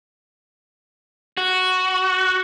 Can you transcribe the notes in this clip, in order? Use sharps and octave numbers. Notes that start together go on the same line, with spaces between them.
F#4